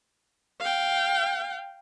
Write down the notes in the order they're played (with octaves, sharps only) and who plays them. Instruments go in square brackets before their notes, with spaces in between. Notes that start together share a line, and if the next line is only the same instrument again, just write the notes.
[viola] F5 G5